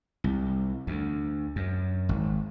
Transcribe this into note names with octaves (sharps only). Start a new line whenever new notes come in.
C2
D2
F#2
G#1